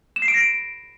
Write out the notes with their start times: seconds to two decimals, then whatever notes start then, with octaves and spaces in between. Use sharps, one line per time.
0.16 E7
0.22 C7
0.28 D7
0.34 A#6